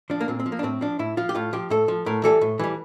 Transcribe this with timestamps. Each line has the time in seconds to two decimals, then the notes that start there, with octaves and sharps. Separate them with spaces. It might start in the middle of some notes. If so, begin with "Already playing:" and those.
0.10 F3 D4
0.21 A#3
0.28 A#2 C4
0.40 C4
0.46 F3
0.52 A#3
0.59 D4
0.63 A2 C4
0.81 F3 D4
0.99 A2 E4
1.17 F3 F4
1.29 G4
1.35 A2 F4
1.53 F3 G4
1.70 A2 A4
1.88 F3
2.06 A2 A#4
2.24 E3 G3 A4
2.41 A2
2.59 E3 G3